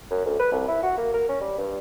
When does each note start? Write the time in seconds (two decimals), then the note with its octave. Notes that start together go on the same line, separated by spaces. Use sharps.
0.11 F#2
0.25 D2
0.39 B4
0.52 C2
0.68 E4
0.83 F#4
0.98 A#3
1.14 A#4
1.29 C#4
1.41 G3
1.58 G2